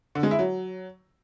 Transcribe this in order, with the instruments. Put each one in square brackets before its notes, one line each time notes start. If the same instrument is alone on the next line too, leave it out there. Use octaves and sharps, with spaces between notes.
[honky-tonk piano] D3
G#3
E4
F#3